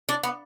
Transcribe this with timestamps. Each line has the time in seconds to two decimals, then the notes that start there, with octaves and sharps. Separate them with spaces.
0.09 D4
0.23 B3